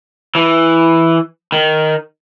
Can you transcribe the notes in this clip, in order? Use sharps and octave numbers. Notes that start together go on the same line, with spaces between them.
E3
D#3